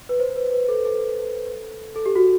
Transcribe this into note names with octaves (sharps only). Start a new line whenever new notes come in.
B4
C5
B4
B4
A4
A4
A4
G4
F#4